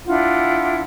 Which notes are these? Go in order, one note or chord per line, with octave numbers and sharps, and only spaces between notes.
D4 E4 F4 F#5